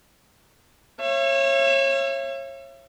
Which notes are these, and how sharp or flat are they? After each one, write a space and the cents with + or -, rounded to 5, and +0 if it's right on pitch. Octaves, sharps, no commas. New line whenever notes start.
C#5 -25 E5 +35